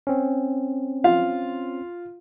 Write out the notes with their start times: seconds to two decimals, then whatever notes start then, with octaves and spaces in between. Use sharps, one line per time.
0.07 C4 C#4
1.04 F4 F5